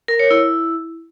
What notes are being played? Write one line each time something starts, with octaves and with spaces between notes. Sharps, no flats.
A#4
C#5
E4